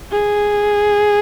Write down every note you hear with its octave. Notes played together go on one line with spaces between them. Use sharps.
G#4